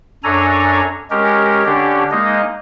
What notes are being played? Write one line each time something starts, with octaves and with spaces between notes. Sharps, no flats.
F#2 D4 A4 C#5 G#5 A#5
G#3 C#4 G4 A#4
D3 C#4 D4 G4
G#3 A#3 D#4 D#5